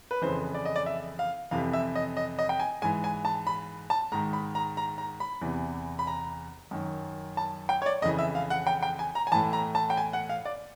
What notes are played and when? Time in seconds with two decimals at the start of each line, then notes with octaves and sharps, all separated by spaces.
0.11 B4
0.22 F2 C#3 E3 C5
0.54 D5
0.65 D#5
0.76 D5
0.86 E5
1.19 F5
1.51 F2 C3 E3 F5
1.73 E5
1.95 D#5
2.17 D#5
2.39 D#5
2.49 G5
2.60 G#5
2.82 G#2 E3 G#5
3.04 G#5
3.25 A5
3.47 B5
3.90 A5
4.12 G#2 D#3 A#5
4.33 B5
4.55 A#5
4.77 A#5
4.98 A#5
5.20 B5
5.41 E2 C3 E3
5.99 B5
6.07 A#5
6.71 F#2 D#3
7.37 A5
7.69 G5
7.82 C#5
7.86 D5
8.02 F2 C#3 E3 D#5
8.19 E5
8.35 F5
8.50 F#5
8.67 G5
8.83 G5
8.99 G#5
9.15 A#5
9.27 G#5
9.32 A2 E3 A5
9.53 A#5
9.75 A5
9.90 G5
9.97 G#5
10.13 F#5
10.29 F5
10.45 D5